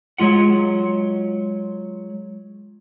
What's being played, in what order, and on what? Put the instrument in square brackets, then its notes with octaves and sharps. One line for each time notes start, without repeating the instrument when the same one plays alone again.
[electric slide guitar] F#3 G#3 F4 F#5